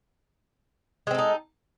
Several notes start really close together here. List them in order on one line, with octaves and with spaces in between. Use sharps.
G#3 C4 A4 D#4